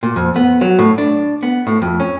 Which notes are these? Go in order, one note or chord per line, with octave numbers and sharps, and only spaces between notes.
A#2
F2
B3
F#3
A2
D4
B3
A2
F2
C#4